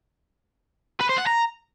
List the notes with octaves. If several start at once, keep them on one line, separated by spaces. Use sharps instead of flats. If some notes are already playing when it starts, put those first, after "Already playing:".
B4
C5
F#5
A#5